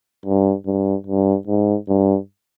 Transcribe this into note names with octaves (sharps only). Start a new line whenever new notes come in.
G2
G2
G2
G#2
G2